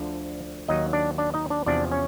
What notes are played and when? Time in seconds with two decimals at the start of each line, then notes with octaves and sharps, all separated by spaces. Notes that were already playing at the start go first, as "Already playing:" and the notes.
Already playing: D2 D3 F3 D4 D5
0.68 D#2 D#3 F#3 D#4 D#5
0.93 D4 D5
1.18 D4 D5
1.34 D#4 D#5
1.50 D4 D5
1.66 E2 C3 F3 D4 D5
1.91 C#4 C#5